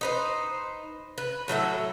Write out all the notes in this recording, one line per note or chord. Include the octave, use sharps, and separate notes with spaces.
D#4 B4 C5
B4
A2 F#3 A4 E5